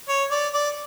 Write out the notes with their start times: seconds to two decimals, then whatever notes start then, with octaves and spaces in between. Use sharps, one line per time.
0.09 C#5
0.31 D5
0.53 D5